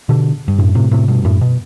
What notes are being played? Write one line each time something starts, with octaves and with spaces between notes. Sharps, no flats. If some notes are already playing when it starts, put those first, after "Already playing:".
B2 D3
G2
F#2 A2
A2 C3
A2 C3
G2 B2
F#2 A2
B2